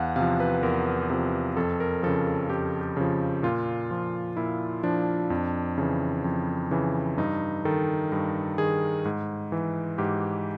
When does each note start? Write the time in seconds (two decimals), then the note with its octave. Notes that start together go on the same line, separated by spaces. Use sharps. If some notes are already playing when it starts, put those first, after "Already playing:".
Already playing: E2 F5 F#5
0.16 C3 F3 F5
0.40 B4
0.63 E2 A#4
1.10 C3 F3
1.57 F2 A4
1.80 A#4
2.03 C#3 F3 A4
2.27 A4
2.50 F2 G4
2.81 G4
2.97 C#3 F3
3.43 A#2 F4
3.91 F3
4.37 A#2 E4
4.84 F3 D4
5.30 F2
5.78 C#3 E3
6.24 F2
6.71 C#3 E3
7.18 G2 D#4
7.65 D#3 A4
8.12 G2 A#4
8.58 D#3 G#4
9.05 G#2
9.52 E3
9.98 G#2 G4